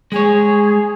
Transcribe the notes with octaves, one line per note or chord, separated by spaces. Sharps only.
G#3 G#4 C#5